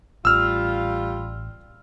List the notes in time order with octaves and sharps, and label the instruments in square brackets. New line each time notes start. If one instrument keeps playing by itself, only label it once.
[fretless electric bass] A1 [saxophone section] G3 F4 [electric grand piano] E6 F6